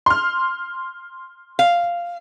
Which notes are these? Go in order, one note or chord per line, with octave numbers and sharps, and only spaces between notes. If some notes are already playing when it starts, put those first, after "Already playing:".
C6 F6
F5